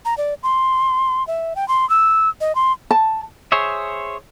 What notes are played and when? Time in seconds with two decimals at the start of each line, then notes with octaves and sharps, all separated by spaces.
0.05 A#5
0.18 D5
0.43 C6
1.27 E5
1.56 G5
1.68 C6
1.90 E6
2.41 D#5
2.55 C6
2.91 A5
3.52 G#4 C5 C#5 E5